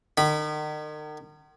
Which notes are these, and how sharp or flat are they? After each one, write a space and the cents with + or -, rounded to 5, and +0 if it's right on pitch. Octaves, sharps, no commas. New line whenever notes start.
D#3 -40 B5 +0